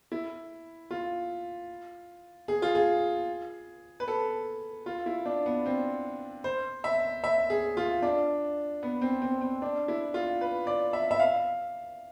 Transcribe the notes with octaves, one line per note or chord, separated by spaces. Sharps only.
E4
F4
G#4
F4
G#4
B4
A4
F4
E4
D4
B3
C4
C5
E5
E5
G#4
F4
D4
B3
C4
C4
C4
D4
E4
F4
B4
D5
E5
E5
F5